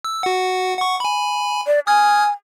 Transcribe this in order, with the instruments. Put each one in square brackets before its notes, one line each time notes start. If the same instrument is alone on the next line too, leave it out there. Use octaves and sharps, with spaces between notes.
[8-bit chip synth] E6
F#4 F#5
F#5 C#6
G#5 B5
[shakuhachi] D5
[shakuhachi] G#5 [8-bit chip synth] D#6 F6 G#6